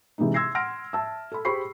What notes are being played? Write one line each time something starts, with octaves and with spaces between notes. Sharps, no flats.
C3 E3 G#3 D4 D#4
C6 E6 G#6 A#6 C7
F#5 C6 F6 A#6 D7
E5 A5 E6
A4 B5
G4 G#4 C5 B5 C#6 C7